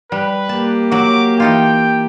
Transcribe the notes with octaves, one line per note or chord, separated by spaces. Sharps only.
G3 B4
A#3 G4 A5
F#3 F#4 D6
E3 D#4 F4 G5